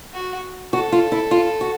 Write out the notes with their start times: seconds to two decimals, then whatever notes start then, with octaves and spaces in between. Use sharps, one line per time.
0.14 F#4
0.73 F#4 A4
0.92 F4
1.12 E4
1.31 F4
1.61 F#4